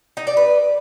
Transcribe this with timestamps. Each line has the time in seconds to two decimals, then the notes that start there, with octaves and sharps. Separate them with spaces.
0.17 D#4
0.27 D5
0.37 B4